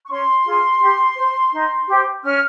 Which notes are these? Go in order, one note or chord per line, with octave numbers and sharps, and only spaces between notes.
C#6
C#4 C6
F4 G#4
G4
C5
D#4
G4 C5
C#4 F6